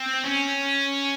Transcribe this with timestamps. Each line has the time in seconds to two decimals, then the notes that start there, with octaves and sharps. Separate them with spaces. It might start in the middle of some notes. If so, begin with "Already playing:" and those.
Already playing: C4
0.24 C#4